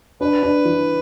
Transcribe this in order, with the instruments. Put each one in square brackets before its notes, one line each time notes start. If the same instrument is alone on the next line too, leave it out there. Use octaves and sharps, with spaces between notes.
[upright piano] D4 [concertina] B4
[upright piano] D4
E3